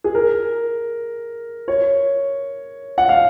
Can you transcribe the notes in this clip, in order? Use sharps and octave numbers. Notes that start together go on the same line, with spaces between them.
G#4
A#4
C#5
F#5
F5